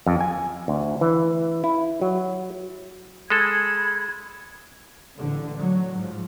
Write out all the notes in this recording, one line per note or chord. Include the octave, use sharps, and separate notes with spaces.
F2
G#5
D2
E3
E4
F#3
G#3 A4 B5 G#6
A1 D3
F#3
G#2 F3